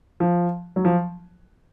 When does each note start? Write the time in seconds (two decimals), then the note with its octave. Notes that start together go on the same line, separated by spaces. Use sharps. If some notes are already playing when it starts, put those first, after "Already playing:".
0.20 F3
0.76 F#3
0.85 F3